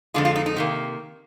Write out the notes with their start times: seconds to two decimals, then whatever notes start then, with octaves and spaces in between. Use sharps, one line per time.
0.14 F2 D3 G#3 F4
0.25 F4
0.36 D#4
0.46 D#4
0.56 C3 D#3 A#3